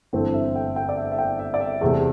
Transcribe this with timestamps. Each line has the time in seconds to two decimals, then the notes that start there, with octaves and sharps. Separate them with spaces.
0.13 G1 G2 E3 A3 C4 G5
0.34 E5
0.55 G5
0.76 G5
0.89 D5
0.97 E5
1.11 E5
1.18 G5
1.39 E5
1.54 D5
1.60 E5
1.81 E2 C3 A3